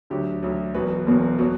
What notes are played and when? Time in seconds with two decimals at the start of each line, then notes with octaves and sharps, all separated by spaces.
0.10 D2 D3 F#3 G4
0.43 D2 D3 F#3
0.74 E1 E2 B2 F#3 B4
1.07 E1 E2 B2 F#3
1.39 B2 F#3